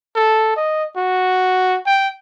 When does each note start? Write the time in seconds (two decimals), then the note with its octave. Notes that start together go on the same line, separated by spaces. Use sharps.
0.16 A4
0.57 D#5
0.97 F#4
1.86 G5